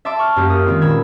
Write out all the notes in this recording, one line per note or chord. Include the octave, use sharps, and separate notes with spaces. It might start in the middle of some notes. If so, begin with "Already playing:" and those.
E5 A5 C6 D6 E6
C#6 F6
F#2 A#3 G4
D#6 F6
D#3 G#3 C4 F4
D#1 B5 E6 G#6